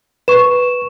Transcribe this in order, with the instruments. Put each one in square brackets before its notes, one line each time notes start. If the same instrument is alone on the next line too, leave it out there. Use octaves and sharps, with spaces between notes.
[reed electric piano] B4 [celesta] C#6 E7